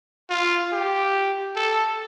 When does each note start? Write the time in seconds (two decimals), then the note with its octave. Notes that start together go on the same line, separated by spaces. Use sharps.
0.30 F4
0.72 G4
1.56 A4